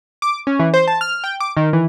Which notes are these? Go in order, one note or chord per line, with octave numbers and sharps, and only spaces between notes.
D6
C#4
E3
C5
A5
F6
G5
D6
D#3
E3